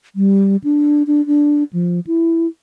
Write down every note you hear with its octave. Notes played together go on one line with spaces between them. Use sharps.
G3
D4
D4
D4
F3
E4